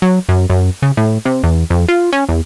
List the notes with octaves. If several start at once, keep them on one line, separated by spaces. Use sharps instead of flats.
F#3
F#2
F#2
C#3
A2
C3
E2
F2
F4
C#4
E2